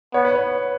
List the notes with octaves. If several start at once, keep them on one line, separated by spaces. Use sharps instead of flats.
B3 C#5
B4
C#5